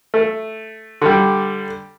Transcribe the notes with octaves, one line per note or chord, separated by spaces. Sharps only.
A3
D3 G3